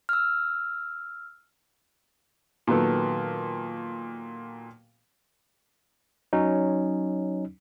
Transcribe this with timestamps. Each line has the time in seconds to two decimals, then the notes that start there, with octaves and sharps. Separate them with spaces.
0.09 E6 F6
2.67 A#2 D#3 F#3 B3 A4
6.33 F#3 C#4 D#4